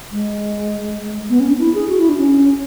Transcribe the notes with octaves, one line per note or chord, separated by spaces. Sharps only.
G#3
B3
C#4
D4
E4
G#4
F#4
E4
D4
C#4